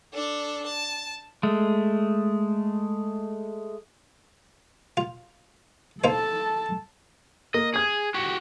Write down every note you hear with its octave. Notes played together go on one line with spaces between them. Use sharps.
D4 A4
A5
G#3 A3
F4
A#3 D#4 A4 C5 A5
A#3 D#5
G#4 D#6 G#6
F#4 G4